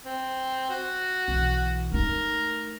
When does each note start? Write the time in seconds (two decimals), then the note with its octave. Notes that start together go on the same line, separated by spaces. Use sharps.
0.05 C4
0.70 F#4
1.28 B1 E3
1.92 A3 D#4 A#4